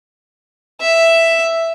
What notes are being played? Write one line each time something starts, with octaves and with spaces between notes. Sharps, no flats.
E5